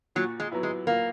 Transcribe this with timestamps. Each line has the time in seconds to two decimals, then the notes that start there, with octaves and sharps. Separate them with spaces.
0.16 A#2 F#3
0.40 G#3
0.51 F#3 B3 E4
0.63 G#3
0.87 A#2 A#3